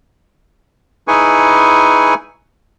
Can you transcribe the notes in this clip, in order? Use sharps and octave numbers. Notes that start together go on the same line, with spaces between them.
D#4 E4 G#4 B4 G#5 C#6